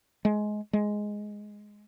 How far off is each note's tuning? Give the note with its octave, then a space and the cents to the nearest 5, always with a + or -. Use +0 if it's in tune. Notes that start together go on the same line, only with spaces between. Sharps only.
G#3 +20
G#3 +5